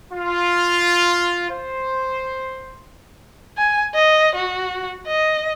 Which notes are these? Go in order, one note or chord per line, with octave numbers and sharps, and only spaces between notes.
F4
C5
G#5
D#5
F#4
D#5